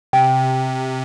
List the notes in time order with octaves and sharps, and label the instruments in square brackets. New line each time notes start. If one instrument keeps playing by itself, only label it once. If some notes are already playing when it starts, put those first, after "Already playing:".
[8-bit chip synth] C3 [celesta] G5